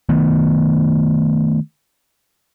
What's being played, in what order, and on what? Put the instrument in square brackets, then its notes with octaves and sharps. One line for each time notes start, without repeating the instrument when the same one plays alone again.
[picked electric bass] D#3 A3 B3